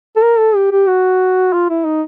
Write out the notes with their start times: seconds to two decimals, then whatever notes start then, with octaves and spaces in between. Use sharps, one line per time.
0.16 A4
0.22 A#4
0.38 A4
0.56 G4
0.72 G4
0.87 F#4
1.53 F4
1.70 E4
1.85 D#4